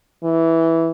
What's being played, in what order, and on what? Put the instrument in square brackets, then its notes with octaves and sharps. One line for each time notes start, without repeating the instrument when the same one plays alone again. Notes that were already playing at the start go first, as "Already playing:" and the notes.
[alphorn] E3